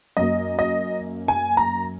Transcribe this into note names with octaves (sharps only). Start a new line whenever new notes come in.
F#2 F#3 A#3 D#5
D#5
G#5
A#5